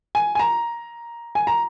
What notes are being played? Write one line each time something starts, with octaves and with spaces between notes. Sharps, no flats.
G#5
G#5
A#5
G#5
A#5